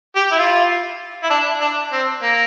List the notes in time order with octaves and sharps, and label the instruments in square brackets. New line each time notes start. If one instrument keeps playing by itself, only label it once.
[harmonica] G4
E4
F4
E4
D4
D4
C4
A#3